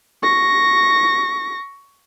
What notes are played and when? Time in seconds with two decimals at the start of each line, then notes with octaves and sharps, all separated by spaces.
0.23 C#6 A#6